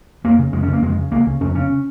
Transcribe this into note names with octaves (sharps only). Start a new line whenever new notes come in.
F2 A#3
C#3
F2 G#3
C#4
C#3
A#3
F2 G#3
C#3
C#2 A#3
C#3
F2 C#4
C#3 C#4